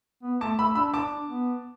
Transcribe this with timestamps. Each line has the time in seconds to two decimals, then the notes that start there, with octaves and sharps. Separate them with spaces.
0.23 B3
0.41 A3 A5 D6
0.58 A3 B5 E6
0.75 D4 B5 E6
0.94 D4 A5 D6
1.27 B3